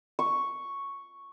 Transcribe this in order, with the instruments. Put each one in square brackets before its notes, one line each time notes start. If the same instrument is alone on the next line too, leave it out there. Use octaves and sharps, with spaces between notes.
[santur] C#6